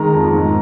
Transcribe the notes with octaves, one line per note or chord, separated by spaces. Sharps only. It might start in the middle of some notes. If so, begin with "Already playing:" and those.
Already playing: D#3 G#3 A#5
F2
G#2